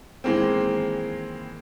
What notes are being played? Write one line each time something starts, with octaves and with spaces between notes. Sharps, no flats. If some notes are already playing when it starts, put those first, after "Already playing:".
D#3 E3 G#3 A#3 C4